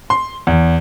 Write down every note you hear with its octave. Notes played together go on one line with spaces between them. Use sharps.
C6
E2